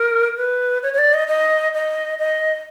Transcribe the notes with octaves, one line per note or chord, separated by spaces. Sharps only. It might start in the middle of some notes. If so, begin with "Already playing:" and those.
Already playing: A#4
B4
C#5
C#5
D5
D#5
D#5
D#5
D#5